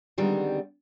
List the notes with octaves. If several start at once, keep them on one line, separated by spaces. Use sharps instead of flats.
D3 D#3 G3 G#3 B3 C4